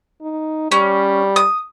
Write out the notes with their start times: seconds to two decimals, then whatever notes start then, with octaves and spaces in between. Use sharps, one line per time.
0.22 D#4
0.72 G3 C#4
1.36 D#6